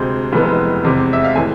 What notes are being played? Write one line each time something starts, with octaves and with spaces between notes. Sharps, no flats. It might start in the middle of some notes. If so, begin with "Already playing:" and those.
Already playing: D2 C3 G#3 C5
F1 F2 E3 G#3 B3
E2 C3 G#3 C4
E5
F5
A2 E3 G#3 G#5